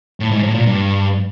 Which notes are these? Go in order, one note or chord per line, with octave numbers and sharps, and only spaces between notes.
A2
G#2
A2
A#2
G2